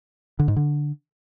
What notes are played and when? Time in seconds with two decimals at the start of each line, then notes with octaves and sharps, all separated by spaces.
0.39 D3
0.48 G#2
0.56 D3